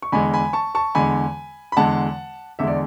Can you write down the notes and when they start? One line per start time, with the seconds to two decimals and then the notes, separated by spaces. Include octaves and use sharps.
0.02 C#6
0.12 E2 D3 G#3 G#5 B5
0.33 G#5 B5
0.53 A5 C#6
0.75 A5 C#6
0.95 E2 D3 G#3 G#5 B5
1.72 B5
1.77 E2 D3 G#3 F#5 A5
2.59 E2 D3 G#3 E5
2.67 D5